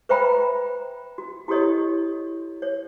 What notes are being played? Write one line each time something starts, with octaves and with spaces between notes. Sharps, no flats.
B4 C5 E5 G5 A#5 B5
F#4
E4 F#4 G4 A4 C#5 D#5
C#5